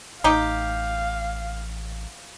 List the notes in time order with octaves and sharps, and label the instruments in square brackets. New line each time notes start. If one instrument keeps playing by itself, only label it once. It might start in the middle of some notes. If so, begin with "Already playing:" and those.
[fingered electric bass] A1 [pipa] D#4 G4 [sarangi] F5